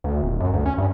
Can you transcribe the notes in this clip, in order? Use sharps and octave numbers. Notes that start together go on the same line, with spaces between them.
D2
D#1
F#2
D2
C#4
G2